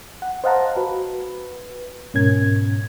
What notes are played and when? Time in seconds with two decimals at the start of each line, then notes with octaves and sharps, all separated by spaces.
0.22 F#5
0.44 C5 D#5 F5 F#5 A5 A#5
0.77 F#4 B4
2.14 G#2 B2 C#4 A#4 G#6